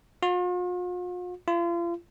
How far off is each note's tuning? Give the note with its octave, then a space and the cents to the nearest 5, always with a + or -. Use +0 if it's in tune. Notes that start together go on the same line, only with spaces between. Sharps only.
F4 +45
F4 -35